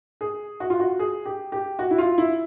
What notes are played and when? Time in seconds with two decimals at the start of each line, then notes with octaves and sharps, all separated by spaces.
0.21 G#4
0.60 F#4
0.70 F4
0.80 F#4
0.99 G#4
1.26 G4
1.52 G4
1.79 F#4
1.91 E4
1.98 F4
2.18 E4